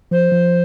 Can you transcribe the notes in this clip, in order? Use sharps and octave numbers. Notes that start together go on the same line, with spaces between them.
F3 C5
F3